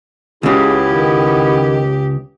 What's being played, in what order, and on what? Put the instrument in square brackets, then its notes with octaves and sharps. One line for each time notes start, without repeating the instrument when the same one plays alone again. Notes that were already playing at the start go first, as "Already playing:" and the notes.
[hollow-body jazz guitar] C#2 C#3 [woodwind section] B3 C#4 E4 [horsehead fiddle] G4 [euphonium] G#4
[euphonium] D#3